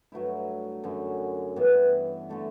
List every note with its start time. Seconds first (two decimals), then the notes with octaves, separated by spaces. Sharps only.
0.12 G2 F#3 A3 E4
0.84 F#2 D3 F#3 C#4
1.56 G2 E3 B3 E4
2.29 D3 A3 E4 A4